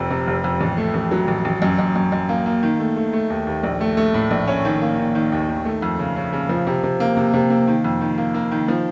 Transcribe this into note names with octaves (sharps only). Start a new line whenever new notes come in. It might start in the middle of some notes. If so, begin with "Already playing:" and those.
Already playing: F1 F2 C3
C3
F1
F2
A1
A3
A1
F#3
A1
A1
F#2
F#2
F#2
F#2
A#3
A#3
D#3
A3
A3
A3
D#2
D#2
A#1
A3
A3
A2
A#1
C#4
D#3
A#3
D#3
D#3
D#2
D#3
A3
F2
C#3
C#3
C#3
F3
C3
C3
A#3
C3
C3
A#3
D#3
F2
D#3
A#3
A#3
D#3
F3